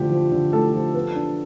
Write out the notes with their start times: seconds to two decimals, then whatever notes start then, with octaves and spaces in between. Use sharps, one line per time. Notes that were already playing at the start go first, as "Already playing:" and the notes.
Already playing: D3 F3 A3 D4 G4
0.10 F3
0.32 D3
0.53 A3 A4
0.74 F3
0.95 B3
1.16 D4